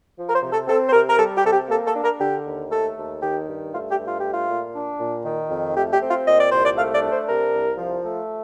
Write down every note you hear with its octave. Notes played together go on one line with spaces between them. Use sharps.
F3
A#4
C5
C3
A4
C4 A4
C5
C3 A#4
A#4
G3 A4
G4
C3 A4
G4
A#3 A4
A4
D4
A#4
D3 G4
D#2
A3 A4
D#2
D#3 G4
G2
A3 F4
G4
G2
F4
A3 G4
F4
A#2
D4
A#2
D#3
F2
A3 G4
G4
C4
F4
A#2 D#5
D5
C2 C5
D5
A3 F5
D5
D4
C5
C3 A#4
C2
F3
A3